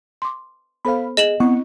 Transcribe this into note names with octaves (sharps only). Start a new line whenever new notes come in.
C6 D6
B3 A4 C5 F5 B5
G#4 D#5 E7 F#7
B3 C4 E4 F#5 C#6